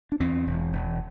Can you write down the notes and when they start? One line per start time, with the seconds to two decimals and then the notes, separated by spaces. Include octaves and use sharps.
0.12 D4
0.20 E2 C4
0.47 E1
0.73 E1